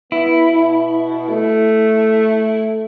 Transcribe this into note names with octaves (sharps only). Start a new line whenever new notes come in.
B3 E4
B2
A3